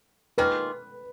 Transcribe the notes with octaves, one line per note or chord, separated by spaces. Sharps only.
D#3 A#3 F4 G#4 B4